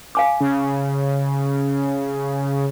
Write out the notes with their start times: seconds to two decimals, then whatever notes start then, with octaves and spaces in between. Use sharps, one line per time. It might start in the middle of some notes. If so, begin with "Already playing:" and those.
0.15 F5 G#5 D6
0.40 C#3